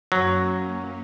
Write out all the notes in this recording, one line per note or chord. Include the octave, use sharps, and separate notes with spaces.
F#2 F#3 A#3 C#4